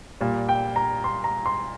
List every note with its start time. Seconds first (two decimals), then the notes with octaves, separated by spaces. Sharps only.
0.21 A#2 G3
0.49 G5
0.76 A#5
1.04 C6
1.24 A#5
1.46 C6